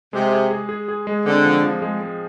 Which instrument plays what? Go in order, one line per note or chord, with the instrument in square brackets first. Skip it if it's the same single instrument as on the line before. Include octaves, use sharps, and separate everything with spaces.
[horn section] C3 [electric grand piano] G#3
[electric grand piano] G#4
G#4
G#4
G#4
G#3
[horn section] D3 [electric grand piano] C4
[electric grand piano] F3
F3
G#3
G#3